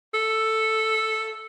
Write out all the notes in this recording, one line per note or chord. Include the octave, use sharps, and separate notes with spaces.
A4